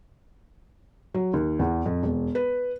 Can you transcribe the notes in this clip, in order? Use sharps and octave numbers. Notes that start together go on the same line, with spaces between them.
F#3
D#2
E2
F2
E1
B4